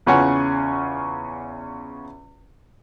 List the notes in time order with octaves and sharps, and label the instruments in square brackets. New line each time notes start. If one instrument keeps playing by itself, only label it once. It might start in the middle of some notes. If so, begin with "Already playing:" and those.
[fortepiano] E2 C#3 C#4 F4 F#5 G#5